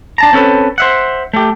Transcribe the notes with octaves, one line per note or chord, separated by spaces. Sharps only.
D4 A5 A#5
C4 C#4 A4 B4
C5 E5 F#5
A3 G4